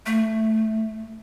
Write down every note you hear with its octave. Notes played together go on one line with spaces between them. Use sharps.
A3